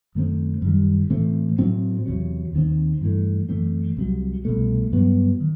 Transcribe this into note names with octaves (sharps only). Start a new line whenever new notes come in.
F#2 D#3 A3 C4
F#2 D#3 G3
A2 E3 A3 C4
A2 F#3 C4
E2 C3 F#3
D#2 D#3 A3 C4
G2 E3 A3
F#2 E3 A3 C4
C2 C3 F#3
C2 B2 A3
G2 F#3 B3
D#3